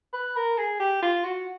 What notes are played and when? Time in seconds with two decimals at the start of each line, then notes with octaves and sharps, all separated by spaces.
0.13 B4
0.36 A#4
0.58 G#4
0.80 G4
1.02 F4
1.25 F#4